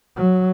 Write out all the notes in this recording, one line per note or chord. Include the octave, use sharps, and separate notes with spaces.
F#3